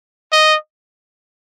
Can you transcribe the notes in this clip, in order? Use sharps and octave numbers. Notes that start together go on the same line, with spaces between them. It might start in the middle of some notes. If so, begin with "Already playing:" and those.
D#5